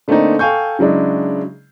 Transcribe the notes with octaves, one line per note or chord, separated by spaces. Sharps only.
D3 A3 A#3 C4 D4 D#4
A4 F5 G5 G#5 C#6 G6
C#3 F#3 G#3 D4 E4